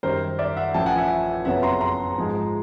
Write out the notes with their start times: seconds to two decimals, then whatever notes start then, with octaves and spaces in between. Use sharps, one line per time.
0.03 F#2 D#3 G3 A#4 C5
0.39 D5 E5
0.56 E5 F#5
0.74 A1 A2 F3 G5 A5
0.86 F#5 G#5
0.98 E5 F#5
1.45 F#1 F2 C#3 F#3 B3 E5 F#5
1.63 A#5 C6
1.81 A#5 C6
2.16 G#2 F3 G#3